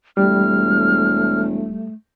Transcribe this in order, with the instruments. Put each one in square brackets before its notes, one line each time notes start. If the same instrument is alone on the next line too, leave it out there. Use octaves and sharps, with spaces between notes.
[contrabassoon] E1 [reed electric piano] G3 [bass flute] A3 [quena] F6